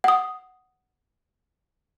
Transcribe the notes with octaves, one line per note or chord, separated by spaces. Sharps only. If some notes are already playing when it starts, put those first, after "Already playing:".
F#5 D#6